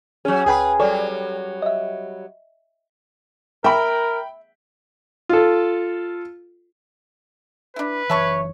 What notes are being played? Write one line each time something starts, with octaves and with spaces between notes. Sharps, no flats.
F#3 C#4 G#4
C#2 G#4 B4 G5 B5
F#3 G3 A4 C#5 D5
D#5 E5
A#4 E5 G5 B5
F4 A4
D4 E4 B4
F#1 E3 C#5 E5 A5 C#6